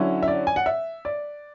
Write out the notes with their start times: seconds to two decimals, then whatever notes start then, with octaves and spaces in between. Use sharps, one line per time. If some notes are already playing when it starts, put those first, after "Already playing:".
Already playing: D3 F#3 C#4 E4
0.23 E5
0.28 D5
0.47 G#5
0.56 F#5
0.66 E5
1.05 D5